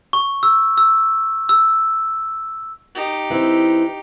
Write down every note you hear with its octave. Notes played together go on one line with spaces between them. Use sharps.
C#6
E6
E6
E6
D#4 G4
E3 C4 E4